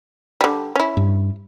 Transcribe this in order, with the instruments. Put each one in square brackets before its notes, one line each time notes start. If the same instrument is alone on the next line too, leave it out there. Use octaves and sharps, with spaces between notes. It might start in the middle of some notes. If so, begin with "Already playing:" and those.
[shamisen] D3 G3
C#4 E4
[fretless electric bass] G2